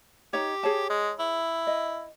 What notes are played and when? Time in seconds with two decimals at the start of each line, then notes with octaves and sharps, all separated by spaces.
0.33 D#4 G4 C#5
0.63 G#4 C#5 A5
0.90 G#3
1.19 E4
1.67 D#5